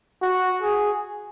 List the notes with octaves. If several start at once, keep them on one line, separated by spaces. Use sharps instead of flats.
F#4
G#4